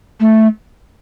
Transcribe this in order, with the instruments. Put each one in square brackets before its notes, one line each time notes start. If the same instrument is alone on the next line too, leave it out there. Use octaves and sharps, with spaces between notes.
[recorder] A3